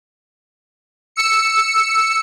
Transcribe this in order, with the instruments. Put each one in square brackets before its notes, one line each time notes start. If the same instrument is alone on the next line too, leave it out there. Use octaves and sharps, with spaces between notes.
[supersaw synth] E6 C#7